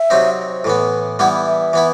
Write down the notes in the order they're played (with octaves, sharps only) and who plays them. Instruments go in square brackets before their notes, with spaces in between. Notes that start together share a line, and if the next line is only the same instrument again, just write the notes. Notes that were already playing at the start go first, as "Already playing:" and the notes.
Already playing: [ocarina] E5
[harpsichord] C3 F#3 C4 D#4
A2 E3 B3
[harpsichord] E3 G3 B3 E4 [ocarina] F#5
[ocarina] E5
[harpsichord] E3 B3 E4